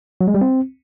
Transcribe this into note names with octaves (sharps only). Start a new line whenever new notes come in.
F#3
G#3
G3
C4